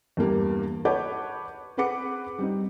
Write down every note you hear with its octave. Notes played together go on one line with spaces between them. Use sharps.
E2 G2 A#3 G4
B4 C#5 F#5 A5 D6 G6
C4 G#4 B4 F#5 D6 C#7
G3 C4 D#4